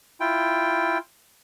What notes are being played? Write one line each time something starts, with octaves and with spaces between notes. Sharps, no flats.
E4 F4 G5